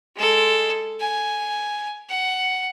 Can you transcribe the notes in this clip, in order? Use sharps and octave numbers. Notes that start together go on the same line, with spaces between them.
G#3 A4
G#5
F#5